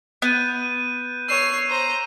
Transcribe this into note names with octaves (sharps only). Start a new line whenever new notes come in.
B3 F#6 G6 D#7
C#5 E6 C7 D#7 E7
C5 A#5 C7